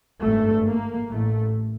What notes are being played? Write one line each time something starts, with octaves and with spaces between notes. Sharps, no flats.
G#1 G2 A3
A#3
A1 A2 A3